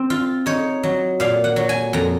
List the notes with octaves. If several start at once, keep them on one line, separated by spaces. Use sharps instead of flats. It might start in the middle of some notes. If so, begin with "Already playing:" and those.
Already playing: C4
F4
D#4 C#5
F#3
A#2 F5
F#5
F#3
G#5
F2 A#5